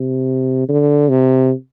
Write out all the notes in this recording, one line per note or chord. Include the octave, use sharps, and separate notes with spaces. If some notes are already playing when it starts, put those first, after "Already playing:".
Already playing: C3
D3
C3